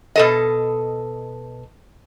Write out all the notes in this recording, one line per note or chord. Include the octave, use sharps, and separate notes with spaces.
B2 A4 D#5